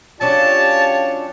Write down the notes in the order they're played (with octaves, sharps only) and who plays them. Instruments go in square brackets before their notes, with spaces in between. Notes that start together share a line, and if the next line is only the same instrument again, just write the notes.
[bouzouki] F#3 C#4 D4 [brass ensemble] F4 G4 C#5 [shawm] A5